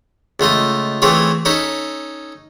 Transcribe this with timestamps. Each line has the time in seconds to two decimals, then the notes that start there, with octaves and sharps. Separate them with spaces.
0.40 C#2 A3 F4 D#5
1.02 E3 A3 C4 F4 G#4 C#5
1.45 C#4 D#4 A4 B5